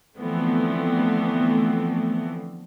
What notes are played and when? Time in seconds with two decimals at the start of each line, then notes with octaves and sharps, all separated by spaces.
0.17 D3 E3 F3 A3 B3 C4